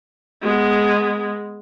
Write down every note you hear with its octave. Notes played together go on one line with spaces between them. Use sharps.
G#3 B3